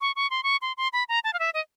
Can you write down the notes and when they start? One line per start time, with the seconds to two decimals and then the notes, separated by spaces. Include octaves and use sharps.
0.01 C#6
0.16 C#6
0.30 C6
0.43 C#6
0.62 C6
0.77 C6
0.93 B5
1.09 A#5
1.24 A5
1.33 F5
1.39 E5
1.54 D#5